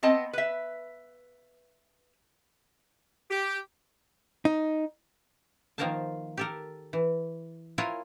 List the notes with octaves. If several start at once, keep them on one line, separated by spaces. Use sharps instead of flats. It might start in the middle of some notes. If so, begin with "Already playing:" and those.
B3 C4 D#5 A5
B4 E5
G4
D#4
D#3 F3 A#3 A#4 C5 A5
G4 A4 A#4
E3
E4 F4 A#4 C#5 F#5 G#5